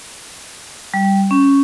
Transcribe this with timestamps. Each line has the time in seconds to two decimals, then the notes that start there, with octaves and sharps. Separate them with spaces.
0.94 G3
1.31 C#4